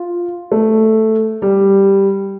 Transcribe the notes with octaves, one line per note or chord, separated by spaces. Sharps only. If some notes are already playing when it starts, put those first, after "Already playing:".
Already playing: F4
A3
G3